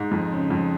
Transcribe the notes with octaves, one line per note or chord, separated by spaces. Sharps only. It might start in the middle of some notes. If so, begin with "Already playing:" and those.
Already playing: G#2
F2
C#3
F2